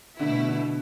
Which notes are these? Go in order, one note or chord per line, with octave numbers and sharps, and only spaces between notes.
B2 D3 A3 E4
D3